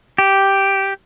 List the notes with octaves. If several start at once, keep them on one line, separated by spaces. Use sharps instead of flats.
G4